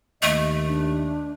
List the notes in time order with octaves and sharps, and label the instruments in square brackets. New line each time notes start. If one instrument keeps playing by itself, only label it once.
[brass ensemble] D#2 [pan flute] A3 [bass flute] D#5
[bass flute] D4